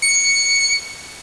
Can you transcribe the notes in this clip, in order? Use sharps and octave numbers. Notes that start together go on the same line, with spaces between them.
C#7